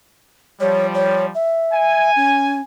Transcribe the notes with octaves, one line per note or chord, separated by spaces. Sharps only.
F3 G3 C#5
C#5
E5
G#5
C#4